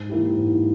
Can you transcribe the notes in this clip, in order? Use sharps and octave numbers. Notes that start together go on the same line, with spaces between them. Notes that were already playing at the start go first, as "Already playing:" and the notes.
Already playing: G#2
E3 A#3 E4 G4
G#2